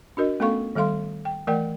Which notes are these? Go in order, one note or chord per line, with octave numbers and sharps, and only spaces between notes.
D4 F#4 A#4 D#5
A3 B3 C#4 A4 F5 C#6
D#3 G3 A4 F5 C6
G5
E3 A3 A#4 D5 F#5 G5